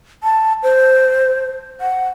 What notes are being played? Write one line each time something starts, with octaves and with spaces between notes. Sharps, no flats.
A5
C5
F#5